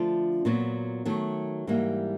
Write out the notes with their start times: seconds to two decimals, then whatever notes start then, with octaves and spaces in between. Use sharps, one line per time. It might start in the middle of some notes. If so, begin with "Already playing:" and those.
Already playing: D3 F3 A3 D4 F4
0.45 A#2 F#3 B3
1.06 D#3 F#3 A3
1.67 G#2 E3 G3 A#3